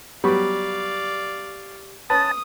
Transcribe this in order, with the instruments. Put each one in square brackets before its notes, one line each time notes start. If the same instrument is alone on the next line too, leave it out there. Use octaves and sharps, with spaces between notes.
[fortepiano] F#3 G3 B3 [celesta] G4 C#6 [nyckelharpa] D5 F5
[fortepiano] C#4 B4 [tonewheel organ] A5 [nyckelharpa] D#6